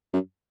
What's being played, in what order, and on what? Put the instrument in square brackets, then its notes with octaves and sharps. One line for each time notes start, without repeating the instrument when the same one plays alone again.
[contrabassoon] F#2